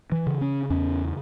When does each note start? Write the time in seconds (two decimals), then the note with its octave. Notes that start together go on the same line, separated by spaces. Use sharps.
0.12 E3
0.27 C#3
0.41 C#4
0.70 E2 C#4